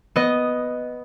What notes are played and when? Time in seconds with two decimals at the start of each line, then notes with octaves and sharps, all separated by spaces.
0.16 B3 D#5